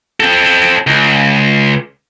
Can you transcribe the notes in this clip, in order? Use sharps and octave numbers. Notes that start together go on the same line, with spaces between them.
C4 A4
C#2